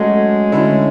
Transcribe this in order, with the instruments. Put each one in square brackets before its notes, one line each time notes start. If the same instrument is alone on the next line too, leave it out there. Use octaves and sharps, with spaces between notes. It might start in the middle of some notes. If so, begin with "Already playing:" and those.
Already playing: [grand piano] F#3 A3 C#4 F#4 [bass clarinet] G#3
[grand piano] D3 A3 C#4 E4